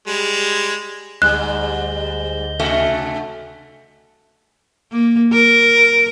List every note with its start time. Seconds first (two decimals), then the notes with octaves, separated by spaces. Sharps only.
0.08 G3 G#3
1.22 D2 G#2 G3 D#5 F#6 G6
2.60 C3 A3 F#4
4.92 A#3
5.33 A#4